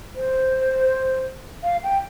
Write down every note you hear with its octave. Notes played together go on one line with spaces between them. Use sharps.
C5
F5
G5